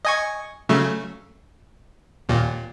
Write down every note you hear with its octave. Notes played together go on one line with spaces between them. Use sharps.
D#5 G#5 C#6
C#3 F#3 A3
D#2 A#2